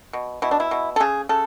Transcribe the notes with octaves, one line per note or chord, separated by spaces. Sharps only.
B2
B2 E4
D4
E4
B2
A4
C#3 G#4
C#3 A4